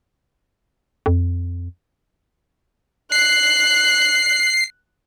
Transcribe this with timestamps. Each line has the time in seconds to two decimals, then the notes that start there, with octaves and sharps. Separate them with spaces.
1.06 F2
3.12 F#6 C7